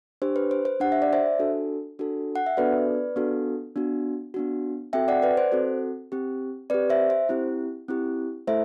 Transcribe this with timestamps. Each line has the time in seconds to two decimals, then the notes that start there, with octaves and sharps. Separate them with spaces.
0.22 D4 G4 C5
0.36 B4
0.51 C5
0.65 C5
0.80 D4 G4 F#5
0.92 E5
1.02 D5
1.13 C5 E5
1.39 D4 F#4 A4
1.99 D4 F#4 A4
2.36 F#5
2.46 E5
2.57 B3 D4 F#4 A4 B4 D5
3.16 B3 D4 F#4 A4
3.76 B3 D4 F#4
4.34 B3 D4 F#4
4.93 C4 F#4 A4 E5 G5
5.08 D5 F#5
5.22 B4 D5
5.37 C5
5.52 C4 F#4 A4
6.12 C4 G4
6.70 C4 B4 D5
6.74 G4
6.90 C5 E5
7.10 C5
7.29 C4 E4 G4
7.88 C4 E4 G4
8.47 A3 E4 A4 C5 E5